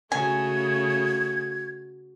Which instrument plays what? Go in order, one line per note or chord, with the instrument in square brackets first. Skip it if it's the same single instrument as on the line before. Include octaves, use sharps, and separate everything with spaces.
[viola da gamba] C#3 [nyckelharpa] A3 F#4 [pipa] G#5 [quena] G#6